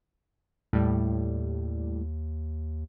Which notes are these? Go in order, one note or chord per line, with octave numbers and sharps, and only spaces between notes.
D#2 A2 G3